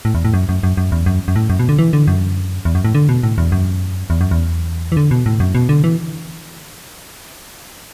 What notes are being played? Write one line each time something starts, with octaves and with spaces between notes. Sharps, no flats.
A2
E2
A2
F#2
F#2
F#2
F#2
E2
F#2
F#2
A2
F#2
B2
D3
E3
D3
F#2
E2
F#2
A2
D3
B2
A2
E2
F#2
E2
F#2
E2
E3
D3
B2
A2
F#2
B2
D3
E3